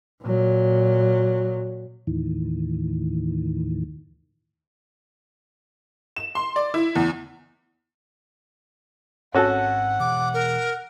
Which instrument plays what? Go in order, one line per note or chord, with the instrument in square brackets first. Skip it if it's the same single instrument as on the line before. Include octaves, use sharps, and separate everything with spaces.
[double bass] A#2 F#3
[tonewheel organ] D#2 A2 D#3 E3
[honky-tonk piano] E7
C6
D5
E4
E2
[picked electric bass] G#2 C4 [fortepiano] C#4 F#4 A4 [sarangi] F#5
[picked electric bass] B2 E3 [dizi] D6
[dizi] A#4